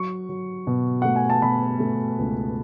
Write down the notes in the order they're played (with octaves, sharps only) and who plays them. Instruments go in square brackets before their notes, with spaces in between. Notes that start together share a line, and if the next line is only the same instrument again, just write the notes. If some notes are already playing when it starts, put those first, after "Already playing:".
Already playing: [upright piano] F#3 C#6
F#3
B2
A3 F#5
G#5
A5
B2 B5
A3
C#2